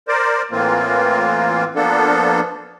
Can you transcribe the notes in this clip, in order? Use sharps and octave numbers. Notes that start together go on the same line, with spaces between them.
A#4 C5 D5
A2 E3 A#3 C4 F4
F3 A#3 B3 D4 A4